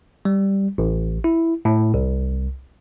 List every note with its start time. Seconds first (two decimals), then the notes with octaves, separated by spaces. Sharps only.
0.25 G3
0.78 A1
1.24 E4
1.65 A2
1.94 C2